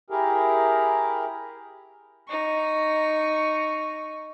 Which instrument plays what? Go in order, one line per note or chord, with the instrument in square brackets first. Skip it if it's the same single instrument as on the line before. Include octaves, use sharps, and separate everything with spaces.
[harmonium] E4 G4 G#4 A#4
[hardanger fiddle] D#4 C#6